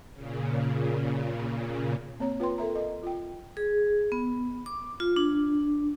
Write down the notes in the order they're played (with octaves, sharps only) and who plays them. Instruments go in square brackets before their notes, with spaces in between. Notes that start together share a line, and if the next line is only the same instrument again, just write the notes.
[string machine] A#2 C#3
[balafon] A#3 C4 C#5 A#5
F4 B4 G5 C6
A4 A#4 E5 A#5
D#5
F4 G5
[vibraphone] G#4
B3
D6
F4
D4